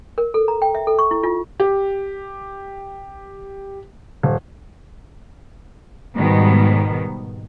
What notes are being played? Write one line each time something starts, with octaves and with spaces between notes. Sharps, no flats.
A#4
A4
A#5
G5
E5
A4
C#6
E4
F4
G4
D#1
G#2 B2 D#3 G3 B3